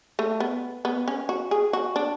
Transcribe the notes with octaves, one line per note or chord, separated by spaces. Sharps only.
A3
B3
B3
C#4
F#4
G#4
F#4
D4